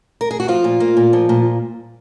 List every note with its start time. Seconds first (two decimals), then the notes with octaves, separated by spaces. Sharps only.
0.21 A#4
0.31 G#4
0.40 F#4
0.48 F3 F4
0.64 A#2
0.80 A#3
0.97 A#2
1.13 F3
1.29 A#2